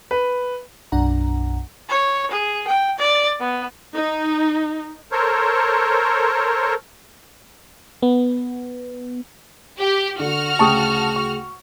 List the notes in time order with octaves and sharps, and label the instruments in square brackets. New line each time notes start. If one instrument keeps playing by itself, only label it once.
[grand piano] B4
[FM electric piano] B1 F#2 D4 F#5 A#5
[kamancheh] C#5
G#4
G5
D5
B3
[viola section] D#4
[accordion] A4 A#4 C5 C#5
[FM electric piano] B3
[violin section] G4
[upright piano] D3 [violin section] F#4 F6
[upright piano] D2 C#3 G5 [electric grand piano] A5 C#6 D#6
[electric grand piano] C#6